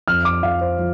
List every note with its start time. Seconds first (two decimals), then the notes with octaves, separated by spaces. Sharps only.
0.08 F2 F6
0.25 D6
0.43 F2 F5
0.61 C5
0.78 F3